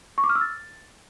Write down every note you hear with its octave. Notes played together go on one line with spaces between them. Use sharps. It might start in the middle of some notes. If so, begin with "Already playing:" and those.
C#6
D6
F6
E6
A6